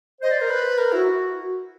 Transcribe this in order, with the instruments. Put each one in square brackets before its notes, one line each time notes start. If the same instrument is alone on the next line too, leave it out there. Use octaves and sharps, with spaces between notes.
[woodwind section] C5 [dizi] D#5
[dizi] D5
A#4
B4
A#4
[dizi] E4 [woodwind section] F#4